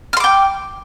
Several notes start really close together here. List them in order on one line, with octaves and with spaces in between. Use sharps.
F6 C6 D6 G5